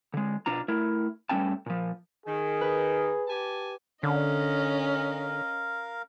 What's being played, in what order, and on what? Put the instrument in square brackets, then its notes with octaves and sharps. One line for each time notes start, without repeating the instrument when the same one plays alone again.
[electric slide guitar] D3 G#3
B2 D4 F4 A#5
A3 E4 A#4
G2 G3 A3 C#4 G5 A5
A#2 F3
[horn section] D#3 [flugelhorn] G#4
[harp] B4
[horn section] G4 G#5 A5
[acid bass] D3 [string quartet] C#4 D#5 [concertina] A#4 F5